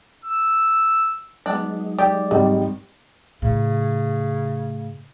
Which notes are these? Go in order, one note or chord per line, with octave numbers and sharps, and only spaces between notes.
E6
F#3 G#3 B3 D4 D#4
G4 D5
G#1 D#3 G3
A2 C#3